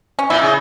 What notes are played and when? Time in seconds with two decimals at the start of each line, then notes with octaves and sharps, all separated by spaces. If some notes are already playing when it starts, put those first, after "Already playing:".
0.19 C#4
0.30 A#2 E4
0.41 C#3